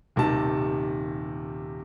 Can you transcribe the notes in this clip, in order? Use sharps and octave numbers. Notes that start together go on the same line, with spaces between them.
D#1 C3 D#3 A5